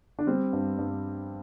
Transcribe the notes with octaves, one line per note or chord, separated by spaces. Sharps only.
D4
G3 C4
G2
G2